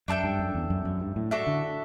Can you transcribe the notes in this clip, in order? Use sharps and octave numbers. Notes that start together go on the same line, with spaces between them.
F#2 D4 A4 E5 G5
G2
F#2
E2
F#2
F#2
G2
A2
D4 F#4 A4 E5
D3